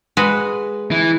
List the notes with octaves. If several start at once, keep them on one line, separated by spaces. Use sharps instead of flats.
G#3 F#4 B4
E3